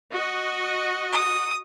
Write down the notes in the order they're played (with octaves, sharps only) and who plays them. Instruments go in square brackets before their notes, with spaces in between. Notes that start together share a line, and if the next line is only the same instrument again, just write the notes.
[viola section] F#4 D#5
[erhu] D#6